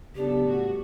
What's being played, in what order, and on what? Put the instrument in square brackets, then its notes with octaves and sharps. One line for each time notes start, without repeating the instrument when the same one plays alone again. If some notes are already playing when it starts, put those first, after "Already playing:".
[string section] C#3 F#3 B3 D4 A4 [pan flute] G4
[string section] A2 G3 B3 F#4